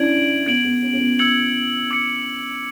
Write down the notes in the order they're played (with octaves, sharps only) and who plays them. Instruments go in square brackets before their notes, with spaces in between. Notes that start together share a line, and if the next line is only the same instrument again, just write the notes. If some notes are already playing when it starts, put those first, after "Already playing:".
Already playing: [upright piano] C#4 D4 E4 [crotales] G#6 D7 F#7
[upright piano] B3 [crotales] G#6 D7 F#7
[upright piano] B3
C#4
C#4
B3
[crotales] E6 G#6 C#7 F#7
D6 G#6 C#7